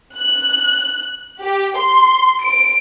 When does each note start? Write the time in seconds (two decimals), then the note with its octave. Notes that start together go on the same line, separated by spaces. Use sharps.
0.18 F#6
1.44 G4
1.80 C6
2.44 D7